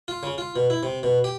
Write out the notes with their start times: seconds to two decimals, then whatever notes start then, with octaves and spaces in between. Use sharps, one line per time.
0.08 F4
0.23 C#3
0.38 F4
0.56 B2
0.70 E4
0.83 C3
1.03 B2
1.24 G4